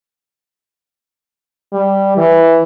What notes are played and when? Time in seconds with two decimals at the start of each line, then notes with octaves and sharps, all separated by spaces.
1.73 G3
2.17 E3